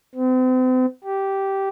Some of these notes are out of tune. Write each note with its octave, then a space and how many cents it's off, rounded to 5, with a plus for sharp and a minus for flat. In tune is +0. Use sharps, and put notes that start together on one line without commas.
C4 -40
G4 -10